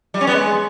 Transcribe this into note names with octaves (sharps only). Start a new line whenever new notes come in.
G3
C#4
B3
G#3